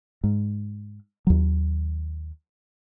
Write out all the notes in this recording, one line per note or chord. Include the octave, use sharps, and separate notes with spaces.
G#2
D#2 F#3